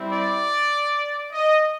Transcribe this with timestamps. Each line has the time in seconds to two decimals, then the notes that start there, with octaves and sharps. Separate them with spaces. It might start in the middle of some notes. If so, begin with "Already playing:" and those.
Already playing: G3 C4 E4
0.13 D5
1.33 D#5